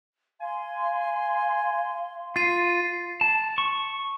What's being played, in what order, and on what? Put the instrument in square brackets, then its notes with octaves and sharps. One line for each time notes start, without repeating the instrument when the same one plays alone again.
[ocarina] F5 [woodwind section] G#5 C6
[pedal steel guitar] F4 [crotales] A6 C7 D#7
[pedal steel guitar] A5
C#6